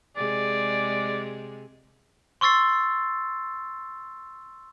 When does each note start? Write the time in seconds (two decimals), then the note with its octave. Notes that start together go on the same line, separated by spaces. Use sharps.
0.17 C3 G#3 G#4 D5
2.41 C6 C#6 E6 A6 C7